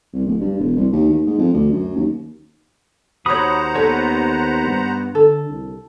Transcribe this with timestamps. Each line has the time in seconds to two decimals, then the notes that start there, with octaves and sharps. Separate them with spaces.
0.13 C2
0.26 D1
0.40 G2
0.58 E1
0.76 C2
0.92 D#2
1.09 D#2
1.26 G#2
1.38 F2
1.53 D2
1.73 F#2
1.96 D#2
3.26 D#2 F#4 C5 C#5 F#5 A#5 B5 D#6
3.75 B3 A4 B4 C#5
4.67 G2
5.15 D3 A4
5.49 C2